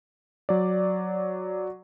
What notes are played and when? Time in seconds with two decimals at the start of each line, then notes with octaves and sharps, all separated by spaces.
0.49 F#3 D5